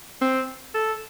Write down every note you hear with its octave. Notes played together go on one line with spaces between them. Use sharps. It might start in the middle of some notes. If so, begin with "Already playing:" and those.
C4
A4